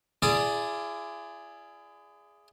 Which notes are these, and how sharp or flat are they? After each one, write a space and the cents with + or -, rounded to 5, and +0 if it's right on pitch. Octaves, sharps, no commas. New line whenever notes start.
E4 +45 G#4 +0 D5 +0